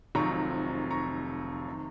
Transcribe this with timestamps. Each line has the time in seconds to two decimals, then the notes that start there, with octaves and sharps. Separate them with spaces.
0.15 F1 F2 C3 D#3 F#3 A#5 C#6
0.91 A#5 C#6
1.68 C3 D#3